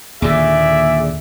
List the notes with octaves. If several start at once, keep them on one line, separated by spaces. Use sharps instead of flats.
D#2 A#2 D3 G#4 D5 E5